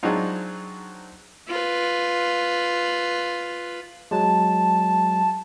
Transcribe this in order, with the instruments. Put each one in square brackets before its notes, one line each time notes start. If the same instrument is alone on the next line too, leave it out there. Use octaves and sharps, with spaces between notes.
[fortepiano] F#3 G#3 C4 D4 D#4 F4
[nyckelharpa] F4 B4
[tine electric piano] F#3 G#3 [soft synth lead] A5